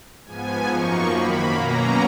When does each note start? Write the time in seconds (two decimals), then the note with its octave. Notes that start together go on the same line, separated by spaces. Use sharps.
0.25 G#2 F3 B3 G#5
0.66 F#2 F3 A#3 D#4 C#6
1.08 F#2 D#3 A#3 B5
1.51 B2 F#3 A#3 C#4 A#5